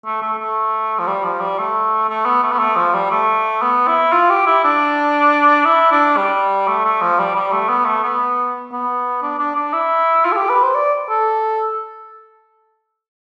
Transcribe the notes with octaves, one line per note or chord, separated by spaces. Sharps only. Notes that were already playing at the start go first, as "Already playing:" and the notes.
A3
A3
A3
F3
G3
F3
G3
A3
A3
B3
A3
B3
A3
F3
G3
A3
B3
E4
F4
G4
E4
D4
E4
D4
G3
A3
A3
F3
G3
G3
A3
B3
A3
B3
B3
D4
D4
D4
E4
F4
A4
G4
B4
C5
D5
A4